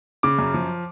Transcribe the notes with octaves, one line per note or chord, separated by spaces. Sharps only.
C#3 D6
F#2
F3